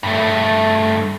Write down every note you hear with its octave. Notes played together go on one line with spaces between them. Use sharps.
G2 A3